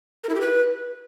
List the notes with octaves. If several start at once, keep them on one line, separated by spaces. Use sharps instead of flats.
A#4
E4
G4
B4